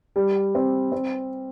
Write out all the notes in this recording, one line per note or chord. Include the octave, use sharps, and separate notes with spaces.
G3
C4
C4